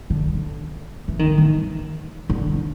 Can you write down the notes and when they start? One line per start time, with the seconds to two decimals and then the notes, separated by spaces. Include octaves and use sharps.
0.10 D3
1.08 E3
1.19 D#3
1.38 E3
2.30 D3